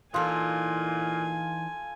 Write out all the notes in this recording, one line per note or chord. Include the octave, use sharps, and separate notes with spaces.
A#2 E3 D#4 F4 A4 G#5